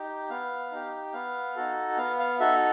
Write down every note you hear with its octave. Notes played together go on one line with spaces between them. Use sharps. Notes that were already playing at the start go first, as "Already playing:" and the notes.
Already playing: D#4 G4
B3 F5
D#4 G4
B3 F5
D#4 F#4 A4
B3 F5
F5
D#4 F#4 A4 E5